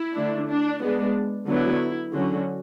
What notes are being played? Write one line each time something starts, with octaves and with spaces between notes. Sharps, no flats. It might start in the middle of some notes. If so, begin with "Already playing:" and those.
Already playing: E4
D3 A3 D4
D4
G#3 B3 D4
D3 F#3 B3 E4
D3 F#3 C#4 F#4